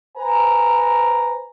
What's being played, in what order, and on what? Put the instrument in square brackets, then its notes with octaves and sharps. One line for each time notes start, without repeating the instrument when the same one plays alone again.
[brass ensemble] B4 C5 G#5 A#5